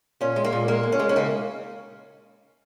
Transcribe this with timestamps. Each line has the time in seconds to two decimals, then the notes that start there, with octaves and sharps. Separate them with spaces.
0.21 A#2 C#4
0.36 G#3
0.44 A#3
0.52 A#2
0.68 G#3 A#3
0.83 G#3
0.92 C#4
0.99 G#3
1.09 C#4
1.16 C#3 A#3 D#4